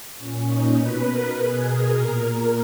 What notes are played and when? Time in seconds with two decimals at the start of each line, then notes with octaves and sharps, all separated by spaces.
0.17 A#2 C#4
0.47 D#4
0.76 B2 B4
1.05 A#4
1.35 B2 G#4
1.64 A#4
1.94 A#2 A#4